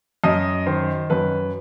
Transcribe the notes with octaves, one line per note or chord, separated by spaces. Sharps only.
F#2 D#5
D#3 C5
F#2 B4